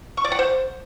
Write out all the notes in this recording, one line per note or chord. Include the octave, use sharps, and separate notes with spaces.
C#6
D5
F#5
C5